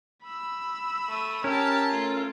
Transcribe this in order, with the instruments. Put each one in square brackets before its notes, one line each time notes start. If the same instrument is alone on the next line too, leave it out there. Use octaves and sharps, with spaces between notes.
[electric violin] B5 E6
[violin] A3 D#7
[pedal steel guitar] C#4 A#4 [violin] G4 A5
[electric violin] A3 A4 [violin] F4